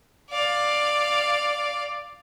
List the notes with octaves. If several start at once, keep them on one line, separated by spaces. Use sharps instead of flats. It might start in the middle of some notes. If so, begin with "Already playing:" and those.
D5 F5